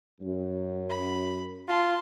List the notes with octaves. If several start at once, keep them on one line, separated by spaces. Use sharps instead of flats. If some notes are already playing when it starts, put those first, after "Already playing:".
F#2
B5
F4 A5 C6